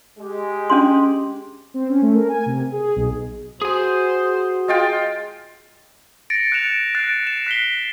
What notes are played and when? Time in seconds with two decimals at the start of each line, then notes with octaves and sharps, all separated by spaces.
0.19 G#3 G4
0.70 C#4 D4 C6
1.74 C4
1.90 C#4
2.02 A3
2.15 A#4
2.28 G#5
2.46 C3
2.72 G#4
2.96 B1
3.62 F#4 G#4 C5 G#5
4.68 G#3 F4 G5
6.30 A6 A#6 C#7 D7
6.52 F#6 A6 C#7 D7 E7 F7
6.95 F#6 A6 A#6 C7 D7
7.27 E7
7.47 F#6 B6 C7 G7